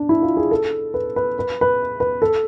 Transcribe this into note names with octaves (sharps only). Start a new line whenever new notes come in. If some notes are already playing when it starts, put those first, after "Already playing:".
Already playing: D4
E4
F4
G#4
A4
B4
B4
B4
B4
B4
A4